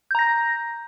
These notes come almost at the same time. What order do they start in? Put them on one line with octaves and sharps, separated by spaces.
G6 A#5 A#6